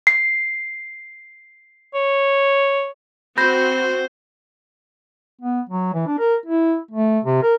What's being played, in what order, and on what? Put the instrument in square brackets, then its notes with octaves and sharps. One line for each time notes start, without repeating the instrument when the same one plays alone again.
[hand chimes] C7
[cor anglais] C#5
[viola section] C4 F#4 [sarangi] C5 [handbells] B5 G6 A#6
[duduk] B3
F#3
E3
D4
A#4
E4
A3
C3
A#4